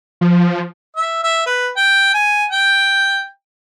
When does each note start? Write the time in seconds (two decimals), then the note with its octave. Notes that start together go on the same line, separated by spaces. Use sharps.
0.21 F3
0.96 E5
1.23 E5
1.46 B4
1.77 G5
2.14 G#5
2.51 G5